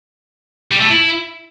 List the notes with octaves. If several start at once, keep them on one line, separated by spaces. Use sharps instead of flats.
G3
A3
E4